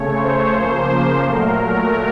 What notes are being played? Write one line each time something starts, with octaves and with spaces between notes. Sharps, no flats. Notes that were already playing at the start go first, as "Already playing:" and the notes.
Already playing: C#3 A3 C#5
C5
C#3 F3 A#3
A#2 F#3 A3 A#4